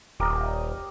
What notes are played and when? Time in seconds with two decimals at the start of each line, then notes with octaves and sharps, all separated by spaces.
0.20 D#1 G4 A#4 D#5